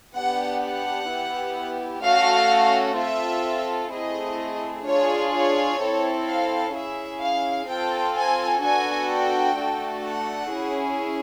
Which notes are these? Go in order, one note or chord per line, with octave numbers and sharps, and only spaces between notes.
B3 D4 G4 F#5
F#5
B3 E4 G4
A3 C#4 F#4 A4 F5
C4 F4 A4 E5
A3 C4 E4 G#4 D#5
D4 F4 G#4 C#5
C#5
C4 E4 A4
F5
C#4 E4 G#4 E5
F5
C4 F4 A4 G5
G#5
B3 D4 F#4 A4 G#5
G5
A3 D4 F#4 A4
F#5
C#4 E4 G#4